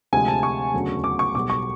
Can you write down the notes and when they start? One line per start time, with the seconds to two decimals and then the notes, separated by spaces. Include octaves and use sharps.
0.13 D2 C3 F3 G#3 G#5
0.28 A5
0.43 C#6
0.73 E1 D2 C#3 F#3
1.04 D6
1.19 C#6
1.35 B1 B2 G3 D6
1.50 C#6